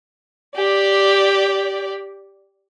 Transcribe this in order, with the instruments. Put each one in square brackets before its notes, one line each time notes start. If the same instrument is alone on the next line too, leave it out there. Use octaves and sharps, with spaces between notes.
[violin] G4 D5